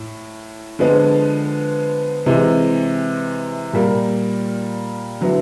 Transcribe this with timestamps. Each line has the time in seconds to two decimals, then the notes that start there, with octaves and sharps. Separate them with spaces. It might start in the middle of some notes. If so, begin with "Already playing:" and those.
Already playing: A2
0.79 D3 F3 G#3 B3
2.26 C3 E3 G#3
3.73 A#2 G3 A#3
5.21 D3 F#3 B3 E4